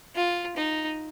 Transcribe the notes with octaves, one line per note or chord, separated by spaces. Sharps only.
F4
D#4